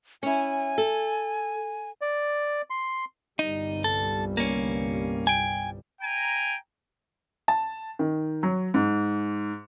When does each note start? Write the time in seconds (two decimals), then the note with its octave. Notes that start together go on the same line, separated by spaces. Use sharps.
0.23 C#4 E4 G#5
0.78 A4
2.01 D5
2.70 C6
3.39 G1 C2 G3 D#4
3.84 A4
4.37 A#3 C#4
5.27 G5 G#5
6.02 G5 G#5 A#5
7.48 A5
7.99 D#3
8.43 F#3
8.74 G#2